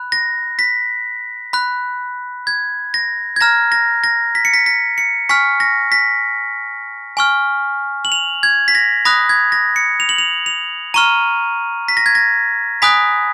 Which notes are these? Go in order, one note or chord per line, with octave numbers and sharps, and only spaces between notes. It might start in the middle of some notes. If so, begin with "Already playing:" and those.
Already playing: B5 F#6
A#6
B6
B5 F#6
G#6
A#6
G#6
A#5 F6 A#6
A#6
A#6
B6
C#7
B6
B6
C#7
G#5 C#6 F6 B6
A#6
B6
G#5 C#6 F6
F#7
F7
G#6
B6
A#6
B5 D#6 F#6 A#6
G#6
A#6
C#7
F7
F#7
F7
F7
A#5 C#6 F6 D#7
B6
A#6
G#6
A#6
G#5 B5 D#6 F#6 B6